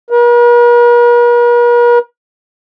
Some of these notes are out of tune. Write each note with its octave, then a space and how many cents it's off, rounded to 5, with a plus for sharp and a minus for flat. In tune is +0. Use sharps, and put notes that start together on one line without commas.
A#4 +45